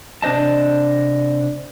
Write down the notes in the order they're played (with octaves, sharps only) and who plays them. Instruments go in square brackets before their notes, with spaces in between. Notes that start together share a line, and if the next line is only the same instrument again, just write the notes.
[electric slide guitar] C3 D4 C5 D#5 A5